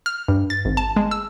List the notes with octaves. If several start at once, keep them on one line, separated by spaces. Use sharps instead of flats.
F6
G2
A6
G#1
A5
G#3
E6